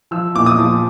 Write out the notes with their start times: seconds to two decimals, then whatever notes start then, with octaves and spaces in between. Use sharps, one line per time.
0.11 F3 E6
0.35 A#2 D6
0.46 D#6
0.58 F3